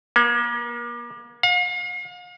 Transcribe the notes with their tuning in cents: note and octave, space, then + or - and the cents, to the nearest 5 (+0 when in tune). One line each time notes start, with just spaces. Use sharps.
A#3 +40
F5 +40